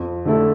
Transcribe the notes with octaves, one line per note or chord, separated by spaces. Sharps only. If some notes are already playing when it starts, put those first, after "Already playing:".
Already playing: F2
D3 A3 E4 A4